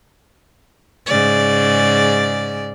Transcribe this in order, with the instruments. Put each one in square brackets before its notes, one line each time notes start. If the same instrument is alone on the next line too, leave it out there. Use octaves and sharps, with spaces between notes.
[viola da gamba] G#2 C#3 D5